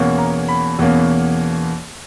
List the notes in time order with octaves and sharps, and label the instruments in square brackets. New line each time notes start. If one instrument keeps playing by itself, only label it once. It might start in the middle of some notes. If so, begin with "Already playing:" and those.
Already playing: [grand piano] E2 B2 A#3 C#4
A#5
B5
E2 B2 A#3 C#4